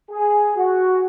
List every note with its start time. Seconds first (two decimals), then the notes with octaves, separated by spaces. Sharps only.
0.10 G#4
0.56 F#4